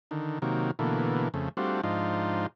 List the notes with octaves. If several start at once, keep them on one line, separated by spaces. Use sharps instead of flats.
D3 D#3
C3 D#3 F#3 A#3
B2 D3 E3 A3 A#3
F2 C#3 A3
G3 A3 C4 D4 F4 F#4
G#2 F3 D4 D#4 F4